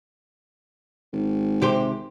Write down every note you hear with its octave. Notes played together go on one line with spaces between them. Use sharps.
G#1
C3 G4 C5